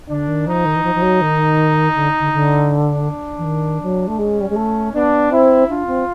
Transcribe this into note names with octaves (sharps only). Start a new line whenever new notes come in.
D3 D4
D#3
F3 D#4
D#3
E3
F3
F3
F#3
D#3
D3
D3
D3
D4
E3
D#3
F#3
A3
G#3 C#4
G3
G#3
A3
B3 D4
C4 E4
D4 F4
C4